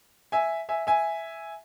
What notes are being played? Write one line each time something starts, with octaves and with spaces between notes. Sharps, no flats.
E5 G#5
E5 G#5
E5 G#5